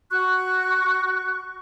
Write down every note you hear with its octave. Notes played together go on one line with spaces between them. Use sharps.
F#4 C#6 F#6